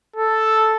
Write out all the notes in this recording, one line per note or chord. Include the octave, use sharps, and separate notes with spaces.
A4